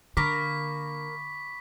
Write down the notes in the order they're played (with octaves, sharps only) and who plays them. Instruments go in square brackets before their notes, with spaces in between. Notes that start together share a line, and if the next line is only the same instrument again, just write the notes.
[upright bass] D3 [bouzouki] A#3 A#4 [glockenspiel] B5 C#6 D6 [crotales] B6